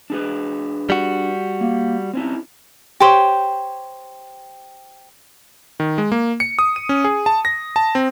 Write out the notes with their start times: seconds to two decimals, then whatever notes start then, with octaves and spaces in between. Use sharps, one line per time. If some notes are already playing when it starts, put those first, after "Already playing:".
0.10 D4 G#4 B4
0.90 G3 F#4
1.61 A#3
2.13 C4 C#4 E4
3.00 G4 C5 C#5
5.80 D#3
5.98 G#3
6.12 A#3
6.40 C#7
6.59 D#6
6.76 D#7
6.89 C#4
7.04 G#4
7.26 A5
7.45 A#6
7.76 A5
7.95 C4